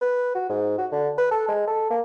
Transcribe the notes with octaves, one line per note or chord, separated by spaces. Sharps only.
B4
F#4
G#2
F#4
D3
B4
A4
G#3
A4
A#3